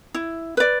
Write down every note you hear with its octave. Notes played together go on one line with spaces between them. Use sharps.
E4
B4 D5